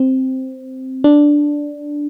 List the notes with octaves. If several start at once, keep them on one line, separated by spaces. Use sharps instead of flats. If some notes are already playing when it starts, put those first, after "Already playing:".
Already playing: C4
D4